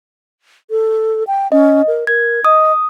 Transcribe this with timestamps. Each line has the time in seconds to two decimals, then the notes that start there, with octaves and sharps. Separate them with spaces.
0.70 A4
1.27 G5
1.52 C#4 D#5
1.88 A#4
2.07 A#4 G#6
2.45 D#5 D#6